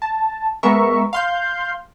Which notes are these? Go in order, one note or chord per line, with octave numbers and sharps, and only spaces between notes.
A5
G#3 B3 A#4 E5 C#6
F5 C6 G6